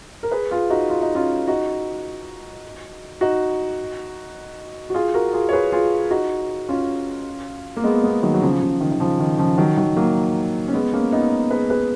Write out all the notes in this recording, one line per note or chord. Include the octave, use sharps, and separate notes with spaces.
A#4
G#4 B4
F4 G#4
D#4 F#4
F4
D#4
C#4 F4
D#4 F#4
D#4 F#4
F#4
F4 G#4
F#4 A#4
F4 G#4
C#5
G#4 B4
F4 G#4
D#4 F#4
C#4 F4
A#3
G#3 B3
G#3 B3
D#3 F#3
F#3
C#3 F3
C#3
D#3
D#3
C#3 F3
D#3
C#3 F3
D#3 F#3
D#3 F#3
F#3 A#3
C#4
G#3 B3
A#3 C#4
B3 D#4
G#4 B4
G#4 B4